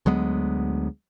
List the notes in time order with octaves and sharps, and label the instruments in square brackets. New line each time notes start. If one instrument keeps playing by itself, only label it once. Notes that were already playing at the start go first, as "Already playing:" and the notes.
[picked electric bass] D2 F#3 G#3 B3